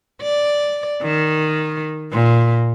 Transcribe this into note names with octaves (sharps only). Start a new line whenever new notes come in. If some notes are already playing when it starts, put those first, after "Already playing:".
D5
D#3
A#2